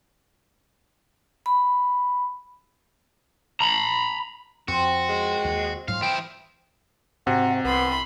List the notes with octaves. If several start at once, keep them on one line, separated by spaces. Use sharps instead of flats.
B5
A#5 B5
F2 C4 F#4
G#3
D#2
G#2 F#3 F4 F5
E3 E4 C5 G5
G#2 C3 F#4
C2 B3 B5 C6